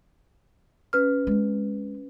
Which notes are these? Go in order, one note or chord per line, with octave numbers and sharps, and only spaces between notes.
C#4 B4 F6
G#3 C4